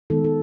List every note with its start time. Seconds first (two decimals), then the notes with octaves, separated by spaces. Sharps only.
0.10 D#3 G#3 B3 A4
0.24 A4